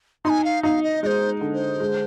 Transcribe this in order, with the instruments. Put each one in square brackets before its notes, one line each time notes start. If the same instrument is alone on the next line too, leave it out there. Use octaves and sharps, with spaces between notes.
[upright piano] D#4 [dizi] C6
[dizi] G#5
F5
[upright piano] D#4 [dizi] F5
[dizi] D#5
[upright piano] G#3 [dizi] C5 D#5
[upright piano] D3
[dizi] C5
[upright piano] G#3